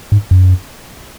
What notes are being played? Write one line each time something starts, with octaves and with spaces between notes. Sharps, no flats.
G#2
F#2